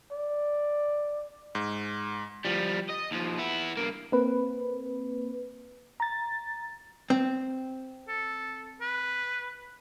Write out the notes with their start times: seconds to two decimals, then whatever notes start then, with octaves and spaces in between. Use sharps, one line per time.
0.11 D5
1.55 G#2
2.45 F3 G3
2.89 D#5
3.11 D#2 F3
3.38 B3 E4
3.77 G2 A#3
4.12 A#3 C4 B4
6.00 A#5 A6
7.10 C4
8.09 A4
8.81 B4